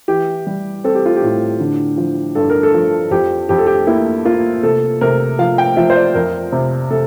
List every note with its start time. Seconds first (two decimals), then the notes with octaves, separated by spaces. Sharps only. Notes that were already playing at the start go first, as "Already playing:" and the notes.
0.08 E3 G4
0.47 G3
0.84 C4 A4
0.95 G4
1.06 F4
1.16 G4
1.22 A2
1.60 D3
1.97 F3
2.35 G2 A4
2.50 A#4
2.63 A4
2.74 F3
3.11 F2 G4
3.49 F2 G4
3.58 A4
3.67 G4
3.87 A#3 E4
4.25 A#3 F4
4.63 C3 A4
5.01 C3 A#4
5.39 F3 F5
5.58 G5
5.77 F3 E5
5.90 C5
5.96 D5
6.15 F2 A#4
6.52 C3
6.91 C3 A4